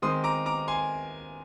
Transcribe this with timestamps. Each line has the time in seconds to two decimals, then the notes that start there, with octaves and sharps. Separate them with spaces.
0.02 D#3 G#3 C4 C6 D#6
0.24 A#5 D6
0.46 A#5 D6
0.68 G#5 C6